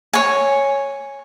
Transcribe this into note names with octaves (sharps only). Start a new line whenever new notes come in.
C#5 G#5